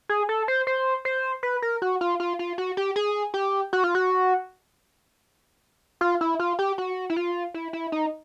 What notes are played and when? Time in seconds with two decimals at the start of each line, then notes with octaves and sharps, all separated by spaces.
0.09 G#4
0.29 A4
0.48 C5
0.67 C5
1.05 C5
1.43 B4
1.62 A#4
1.82 F#4
2.01 F4
2.20 F4
2.39 F4
2.58 F#4
2.77 G4
2.96 G#4
3.34 G4
3.73 F#4
3.84 F4
3.95 F#4
6.01 F4
6.21 E4
6.39 F4
6.59 G4
6.78 F#4
7.10 E4
7.16 F4
7.54 E4
7.73 E4
7.92 D#4